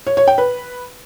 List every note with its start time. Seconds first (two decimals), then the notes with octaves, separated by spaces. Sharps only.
0.07 C#5
0.17 C#5
0.27 G5
0.38 B4